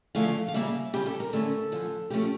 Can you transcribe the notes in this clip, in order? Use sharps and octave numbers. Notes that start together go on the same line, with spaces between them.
D3 F3 A3 C#4 F5
F5
C#3 G3 A#3 E5
C#3 G3 C#4 G4
A4
A#4
D3 A3 C#4 A4
D3 F3 C#4
D3 F3 A3 C#4 G4